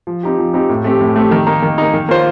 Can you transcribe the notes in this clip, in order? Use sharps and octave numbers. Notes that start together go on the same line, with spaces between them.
F3
C4 D#4 G4
F3
C4 D#4 G4
A2
A3 C4 G4
A2
A3 C4 G4
D#3
A#3 D#4
D#3
A#3 D#4
D#3
A#3 F4 C5